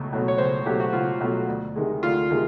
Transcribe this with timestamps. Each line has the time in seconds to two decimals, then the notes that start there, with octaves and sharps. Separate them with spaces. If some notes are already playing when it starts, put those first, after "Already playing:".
Already playing: C#2 B2 F#3 A3
0.12 B2 F#3 A3
0.28 C#5
0.38 C#2 C5
0.66 B2 F#3 A3 G4
0.80 F#4
0.93 C#2 F4
1.20 B2 F#3 A3
1.48 D2
1.76 C3 D#3 G#3
2.03 D2 F4
2.30 C3 D#3 G#3